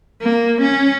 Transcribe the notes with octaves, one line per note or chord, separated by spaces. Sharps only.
A#3
C#4